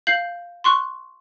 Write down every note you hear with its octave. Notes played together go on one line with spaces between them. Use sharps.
F5 G6 C7 F#7
C6 C#6 F#6